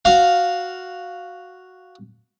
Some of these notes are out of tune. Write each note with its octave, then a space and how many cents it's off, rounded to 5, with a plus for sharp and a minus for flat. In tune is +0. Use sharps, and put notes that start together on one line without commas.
F#4 +0 F5 +0